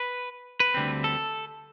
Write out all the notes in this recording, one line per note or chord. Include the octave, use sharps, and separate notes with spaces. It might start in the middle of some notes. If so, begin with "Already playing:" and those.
Already playing: B4
B4
D2 D3 G3 C4
A4